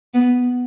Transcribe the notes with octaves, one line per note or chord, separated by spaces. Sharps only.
B3